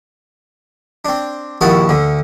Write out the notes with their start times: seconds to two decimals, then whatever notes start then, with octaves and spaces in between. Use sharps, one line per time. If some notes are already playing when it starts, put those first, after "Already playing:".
1.05 C4 D4
1.61 A#1 D#2 E4 F#4 A5 D#6
1.89 D2 D3